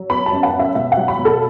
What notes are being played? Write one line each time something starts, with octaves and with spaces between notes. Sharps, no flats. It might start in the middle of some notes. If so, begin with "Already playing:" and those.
Already playing: F#3
B3 B5
A5
F#2
F#5
B3
E5
B2 E5
F#5
F#3
B5
B2
A4